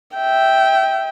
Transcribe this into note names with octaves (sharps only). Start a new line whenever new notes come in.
E5 G5